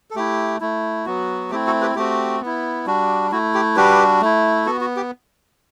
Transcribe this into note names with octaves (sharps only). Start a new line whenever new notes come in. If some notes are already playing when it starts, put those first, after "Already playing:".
A4
A3 E4 G4
A3 E4
F#3 B3 F#4
A3 C4 E4 G4
F#4 A4
G4 B4
A3 C4 F#4 G4
B3 E4
G3 D4 F#4
A3 E4 F#4
G4
G3 D4 F#4 G4 B4
A3 E4
B3 F#4 A4
F#4
G4